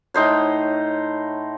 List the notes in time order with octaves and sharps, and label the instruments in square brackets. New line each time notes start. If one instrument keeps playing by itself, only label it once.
[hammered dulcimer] A2 D#4 C5 C#5